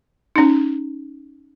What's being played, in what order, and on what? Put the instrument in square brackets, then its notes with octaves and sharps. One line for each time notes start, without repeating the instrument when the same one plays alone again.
[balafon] C#4 D#4